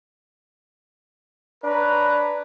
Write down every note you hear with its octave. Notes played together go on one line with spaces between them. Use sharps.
D4 B4 C#5 A#5